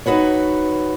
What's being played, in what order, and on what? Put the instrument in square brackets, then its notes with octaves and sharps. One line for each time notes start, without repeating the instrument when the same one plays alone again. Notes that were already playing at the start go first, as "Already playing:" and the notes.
[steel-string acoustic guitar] D#4 F#4 B4 C#5